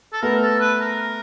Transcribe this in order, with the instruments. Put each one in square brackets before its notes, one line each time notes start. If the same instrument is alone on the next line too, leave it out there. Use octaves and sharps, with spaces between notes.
[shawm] A4
[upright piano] A3 B3 [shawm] A#4
[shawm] A4
B4
A#4